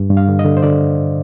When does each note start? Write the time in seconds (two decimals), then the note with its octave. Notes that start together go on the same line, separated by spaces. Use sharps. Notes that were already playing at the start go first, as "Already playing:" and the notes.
Already playing: G2
0.10 G2
0.17 F5
0.28 D3
0.39 D#5
0.45 D3
0.57 C5
0.63 D3 D5